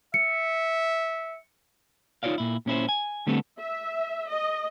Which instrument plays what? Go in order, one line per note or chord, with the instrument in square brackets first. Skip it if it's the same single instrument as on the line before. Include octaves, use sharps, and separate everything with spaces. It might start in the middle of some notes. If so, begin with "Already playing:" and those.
[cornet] E5 [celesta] C#7
[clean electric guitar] D#4 F4 G#4 C#5 D5 F5
A#2 E4
A#2 C#4 E4 C5
G#5
D3 G3 A3 B3 C4 A4
[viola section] E5
D#5